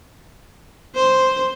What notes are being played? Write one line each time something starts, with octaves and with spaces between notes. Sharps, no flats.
C5